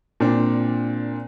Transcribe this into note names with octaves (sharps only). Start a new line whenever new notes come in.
A#2 C4 D4